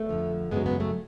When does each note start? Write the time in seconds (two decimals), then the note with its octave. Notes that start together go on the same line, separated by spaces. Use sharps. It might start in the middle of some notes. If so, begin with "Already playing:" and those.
Already playing: A3
0.09 F2 D3 F3
0.51 F#2 C#3 F#3 G#3 B3
0.66 G#3 B3
0.80 F#3 A3